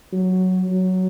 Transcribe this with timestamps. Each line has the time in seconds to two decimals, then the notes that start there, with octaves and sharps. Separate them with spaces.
0.13 F#3
0.70 F#3